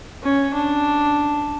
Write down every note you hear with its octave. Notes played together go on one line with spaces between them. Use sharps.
C#4
D4